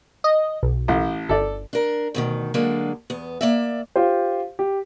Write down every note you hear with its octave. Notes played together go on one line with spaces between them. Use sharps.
D#5
B1
A1
G1 A4 D5
D4 A#4
D2 B2 D#3
D3 F#3 G#3 A#3 D4
E2 B3
A#3 D5 E5
F4 G4 C5
G4